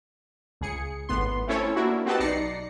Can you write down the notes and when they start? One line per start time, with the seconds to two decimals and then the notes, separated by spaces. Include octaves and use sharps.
0.61 C#2 G#4 C#7
1.09 G#1 A2 B3 C6
1.47 A3 C4 C#4 E4 A4 C#5
1.76 A#3 D4 E4 F#4
2.06 C4 F#4 G4 B4 D#5 A5
2.20 B1 D#4 D5 A#6 C7 C#7